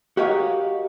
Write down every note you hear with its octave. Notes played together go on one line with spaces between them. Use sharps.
F#4 G4 A#4 C#5 D#5 F5